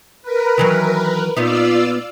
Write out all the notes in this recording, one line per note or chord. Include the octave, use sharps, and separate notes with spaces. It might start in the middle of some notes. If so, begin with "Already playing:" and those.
A#4 B4
D#3 E3 F#3
A#2 B3 D#4 F4 D5 E6